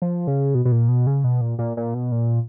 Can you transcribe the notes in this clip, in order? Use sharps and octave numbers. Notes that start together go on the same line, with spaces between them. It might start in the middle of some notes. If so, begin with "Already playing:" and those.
F3
C#3
B2
B2
A#2
B2
C#3
B2
A#2
A#2
A#2
B2
A#2